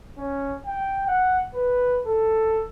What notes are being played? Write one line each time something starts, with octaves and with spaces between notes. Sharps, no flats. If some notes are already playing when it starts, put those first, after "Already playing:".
C#4
G5
F#5
B4
A4